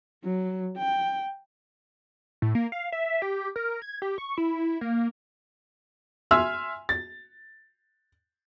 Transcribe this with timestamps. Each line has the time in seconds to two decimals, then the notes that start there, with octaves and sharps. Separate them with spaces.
0.24 F#3
0.78 G5
2.42 A2
2.55 A#3
2.72 F5
2.92 E5
3.22 G4
3.56 A#4
3.82 G#6
4.02 G4
4.18 C#6
4.38 E4
4.81 A#3
6.31 E5 G#5 C6 E6 F6
6.89 A6